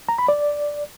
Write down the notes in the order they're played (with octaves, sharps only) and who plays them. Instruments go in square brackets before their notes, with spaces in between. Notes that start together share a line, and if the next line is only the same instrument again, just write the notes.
[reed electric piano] A#5
B5
D5